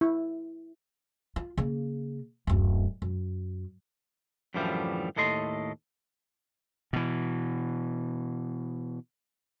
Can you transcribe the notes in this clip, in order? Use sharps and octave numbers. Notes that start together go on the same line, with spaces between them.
E4
F4
C#3 A#3
D1 F#2
F#2
F#2 A2 D3 E3 F3 G3
D#2 A2 A4 D#5 C6
B2 E3